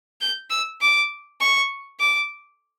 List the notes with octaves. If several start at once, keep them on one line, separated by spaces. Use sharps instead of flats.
G6
E6
D6
C#6
D6